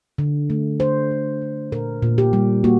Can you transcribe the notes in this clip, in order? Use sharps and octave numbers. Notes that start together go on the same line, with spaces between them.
D3
A3
D4 C5
D3
D3
A#2 A#4
A#2
G4
G3
A#3 F#4